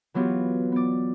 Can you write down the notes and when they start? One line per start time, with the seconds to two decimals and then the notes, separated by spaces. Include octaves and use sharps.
0.14 E3 F#3 B3 F4 G4 B4
0.72 B3 D5